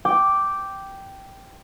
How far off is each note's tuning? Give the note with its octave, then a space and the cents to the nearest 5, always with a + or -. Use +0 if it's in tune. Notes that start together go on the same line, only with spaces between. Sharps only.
G5 -5 D6 +0